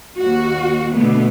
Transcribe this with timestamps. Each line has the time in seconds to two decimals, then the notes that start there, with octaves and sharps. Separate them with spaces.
0.17 D#2 F#4
0.93 B2 D3 A3 B3